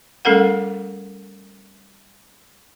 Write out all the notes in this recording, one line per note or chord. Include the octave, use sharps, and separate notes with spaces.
G3 A3 C#4 A4 A#4 F#5